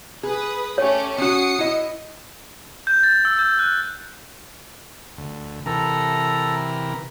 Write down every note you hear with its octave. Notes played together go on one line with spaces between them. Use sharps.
G#4 B4 D#6
A3 C#4 G4 C#5
C#4 F#4 D#6 C7 C#7
E4 D#5
G6
A6
E6
G6
F#6
D2
C3 E3 A4 A#4 A#5